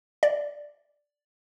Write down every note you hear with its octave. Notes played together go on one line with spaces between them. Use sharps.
D5